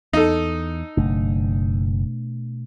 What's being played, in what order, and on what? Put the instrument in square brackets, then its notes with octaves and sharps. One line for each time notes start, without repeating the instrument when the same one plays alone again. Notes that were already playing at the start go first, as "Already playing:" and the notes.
[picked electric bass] E2 [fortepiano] D#4 A4
[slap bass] F#1 [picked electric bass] B2 A3 D4